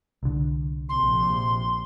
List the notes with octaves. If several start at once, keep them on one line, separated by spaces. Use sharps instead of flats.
C2 D3
A#1 C3 C6